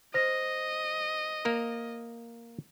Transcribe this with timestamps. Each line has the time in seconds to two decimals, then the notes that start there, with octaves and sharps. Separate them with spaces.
0.14 C5 D#5 A#6
1.45 A#3 A#4